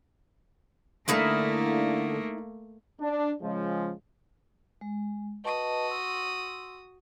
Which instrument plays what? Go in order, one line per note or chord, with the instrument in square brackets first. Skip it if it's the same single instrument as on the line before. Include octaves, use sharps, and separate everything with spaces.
[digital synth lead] D3 [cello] A3 A#3 [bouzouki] D#4 E4 F5
[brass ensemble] D4
C#3 F3 G#3
[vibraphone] G#3
[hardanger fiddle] F#4 D#6 [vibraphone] B4 D#5 A5
[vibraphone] C6 E6